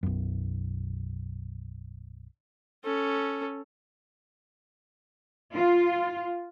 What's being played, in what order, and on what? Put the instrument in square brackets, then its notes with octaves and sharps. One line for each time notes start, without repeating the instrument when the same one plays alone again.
[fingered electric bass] B1 F#2
[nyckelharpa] C#4 A4
[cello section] F4